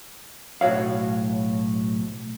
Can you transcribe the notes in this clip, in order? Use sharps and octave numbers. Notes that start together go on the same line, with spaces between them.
B1 A2 F#4 C#5 F5